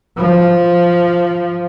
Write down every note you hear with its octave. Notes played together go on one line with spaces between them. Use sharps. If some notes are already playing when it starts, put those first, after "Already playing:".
F3